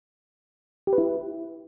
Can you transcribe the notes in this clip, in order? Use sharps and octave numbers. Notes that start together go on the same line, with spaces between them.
G4
B4
E4